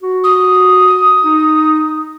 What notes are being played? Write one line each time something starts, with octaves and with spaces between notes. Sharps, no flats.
F#4
D#6
D#4